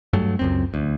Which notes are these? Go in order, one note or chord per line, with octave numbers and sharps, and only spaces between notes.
G2 F#3 A3
C#2 F#2 C4
D2